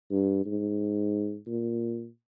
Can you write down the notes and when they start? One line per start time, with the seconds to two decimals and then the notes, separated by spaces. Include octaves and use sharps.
0.11 G2
0.46 G#2
1.47 A#2